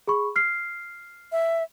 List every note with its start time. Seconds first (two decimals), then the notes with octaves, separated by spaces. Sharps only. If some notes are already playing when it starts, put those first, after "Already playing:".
0.08 G#4 B5 C#6
0.36 F6 C7
1.32 E5